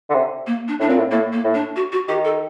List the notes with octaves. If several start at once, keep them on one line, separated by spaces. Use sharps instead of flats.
D3
C3
A#3
D4
A2 D4
A#2 C4
A2
A2 A#3
A#3
A2
D4
F#4
F#4
D#3 G4
A4